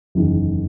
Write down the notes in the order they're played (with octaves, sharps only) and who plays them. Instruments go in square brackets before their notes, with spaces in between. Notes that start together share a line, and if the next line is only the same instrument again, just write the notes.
[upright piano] F#1 E2 D#3